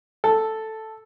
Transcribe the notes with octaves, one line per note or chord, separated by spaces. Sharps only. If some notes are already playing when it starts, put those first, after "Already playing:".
A4